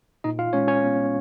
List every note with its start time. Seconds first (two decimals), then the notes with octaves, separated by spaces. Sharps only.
0.24 A#2 D#4 D#5
0.39 F4 F5
0.53 G#3 C#4 C#5
0.68 C#4 C#5
0.82 B3